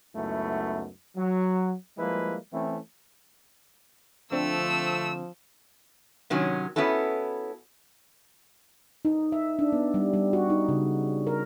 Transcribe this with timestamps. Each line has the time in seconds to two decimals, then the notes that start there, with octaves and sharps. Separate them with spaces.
0.15 C#2 F#2 A3 B3 D#4 E4
1.16 F#3
1.98 F3 G3 G#3 A#3 E4 B4
2.52 E3 A3 C4 C#4 E4
4.32 D3 F3 A3 C4 E6
6.30 C3 D#3 F#3 C#4
6.76 B3 C#4 E4 F#4 A4
9.05 D#4
9.32 E5
9.59 D4
9.73 B3
9.94 G3
10.13 G3
10.33 F#4
10.50 D#4
10.69 C#3
11.27 A#4